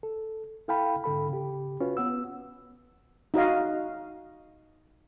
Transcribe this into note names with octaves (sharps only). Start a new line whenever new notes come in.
A4
E4 A4 F5 G5 A5 B5
G#2 D3 A4 B5
C#3 G4
C#4 F4 F#4 B4
B3 F#5 E6
D#4 F#4 D#5 F5